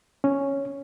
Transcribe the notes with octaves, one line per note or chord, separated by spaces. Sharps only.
C#4